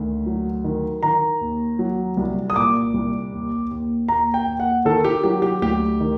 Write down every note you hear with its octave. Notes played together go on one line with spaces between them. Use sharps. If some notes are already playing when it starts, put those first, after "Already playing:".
Already playing: D2 D#3
F#3
D#3
D#3 A#5
D#2
F#3
C2
D#6
A#2 D6
C2
D#2
D#2
D#2 A#5
G5
D#2
F#5
D#3 A4
G4
F#3 G4
G4
D2 G4
D#3